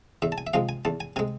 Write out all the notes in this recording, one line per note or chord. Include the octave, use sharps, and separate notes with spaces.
E2 E5
A5
G#5
E5
C3 F3 G#3 F5
G#5
E2 A5
G#5
C3 G#3 G#5